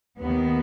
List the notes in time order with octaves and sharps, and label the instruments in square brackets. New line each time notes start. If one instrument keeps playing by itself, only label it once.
[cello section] D#2 D#3 B3